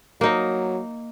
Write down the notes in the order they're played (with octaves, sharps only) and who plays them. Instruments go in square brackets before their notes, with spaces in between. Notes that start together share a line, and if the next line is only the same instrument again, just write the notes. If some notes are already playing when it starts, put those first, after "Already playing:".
[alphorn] F#3 [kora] A#3 D#4